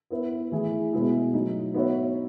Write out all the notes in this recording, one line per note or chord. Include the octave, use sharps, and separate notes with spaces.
B3 E4 B4 E5
E3 A3 E4 G#4
B2 G#3 B3 E4 G#4
F#3 A3 D#4
B3 D#4 F#4 C#5 E5